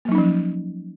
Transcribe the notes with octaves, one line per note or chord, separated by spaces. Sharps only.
F3 F#3 A#3 C#4 D#4